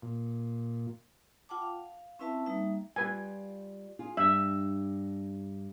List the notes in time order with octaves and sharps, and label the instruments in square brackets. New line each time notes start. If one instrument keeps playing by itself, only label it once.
[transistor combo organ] A#2
[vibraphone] F4 F#5 G5 A5 D6
F5
C4 C#4 E4 B4 E5 A5
G3 A#3 D#4 E5
[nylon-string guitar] G3 F4 [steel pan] B4 G#5
[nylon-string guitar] F4 G#4
[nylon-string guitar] G2 [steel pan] E5